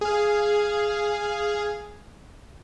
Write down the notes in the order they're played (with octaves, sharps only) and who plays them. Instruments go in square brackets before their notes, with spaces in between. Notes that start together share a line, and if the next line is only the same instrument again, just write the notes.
[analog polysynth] G#4 F5